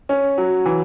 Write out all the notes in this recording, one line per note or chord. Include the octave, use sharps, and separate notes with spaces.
C#4
F#3
E3